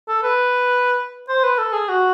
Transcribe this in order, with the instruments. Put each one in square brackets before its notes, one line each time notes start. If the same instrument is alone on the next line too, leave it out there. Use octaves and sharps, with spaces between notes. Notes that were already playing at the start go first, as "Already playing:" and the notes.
[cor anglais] A4
B4
C5
B4
A4
G#4
F#4